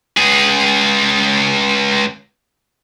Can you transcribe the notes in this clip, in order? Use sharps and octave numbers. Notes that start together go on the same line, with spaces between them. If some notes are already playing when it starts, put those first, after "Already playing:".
C#2 G#4